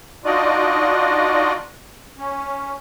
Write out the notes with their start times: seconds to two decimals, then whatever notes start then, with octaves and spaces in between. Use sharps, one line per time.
0.25 D4 D#4 F4 F#4 D5 D#5
2.18 C#4